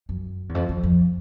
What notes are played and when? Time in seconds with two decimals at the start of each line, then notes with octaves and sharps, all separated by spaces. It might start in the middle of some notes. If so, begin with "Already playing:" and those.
0.09 F#2
0.49 E2
0.55 F2
0.69 F2
0.83 F2